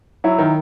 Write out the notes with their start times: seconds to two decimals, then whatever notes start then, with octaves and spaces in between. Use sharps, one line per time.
0.24 F#3 E4
0.38 D#3